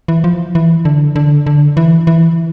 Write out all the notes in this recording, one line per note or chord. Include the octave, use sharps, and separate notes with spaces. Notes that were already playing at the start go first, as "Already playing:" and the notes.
E3
F3
E3
D3
D3
D3
E3
E3